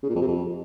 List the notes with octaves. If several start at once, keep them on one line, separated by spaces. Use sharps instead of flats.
C#3
A#2
F2
C3
F2